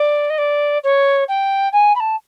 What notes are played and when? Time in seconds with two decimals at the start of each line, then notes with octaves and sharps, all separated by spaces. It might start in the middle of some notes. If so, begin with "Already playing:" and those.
Already playing: D5
0.30 D#5
0.38 D5
0.83 C#5
1.28 G5
1.72 G#5
1.95 B5
2.00 A5